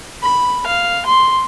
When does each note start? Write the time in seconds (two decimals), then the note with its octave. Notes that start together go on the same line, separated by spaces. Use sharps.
0.22 B5
0.67 F5
1.06 C6